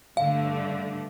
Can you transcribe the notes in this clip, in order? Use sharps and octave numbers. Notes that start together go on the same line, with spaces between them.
G2 D3 A3 F5